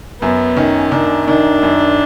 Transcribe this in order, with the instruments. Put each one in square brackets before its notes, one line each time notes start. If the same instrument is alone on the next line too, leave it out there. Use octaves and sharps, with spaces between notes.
[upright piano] F#2 [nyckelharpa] B3
[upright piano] D#3 [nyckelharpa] C#4
[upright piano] D#3 [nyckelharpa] D4
[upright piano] D#3 [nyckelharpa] D4
[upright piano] F#2